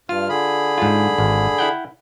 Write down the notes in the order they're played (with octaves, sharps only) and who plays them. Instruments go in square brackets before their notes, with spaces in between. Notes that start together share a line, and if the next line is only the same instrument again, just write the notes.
[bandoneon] G2 F6 [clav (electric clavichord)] F4
[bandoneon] D3 G#4 B5
[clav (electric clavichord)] G#2 F4
G#1
E4 F#5 G5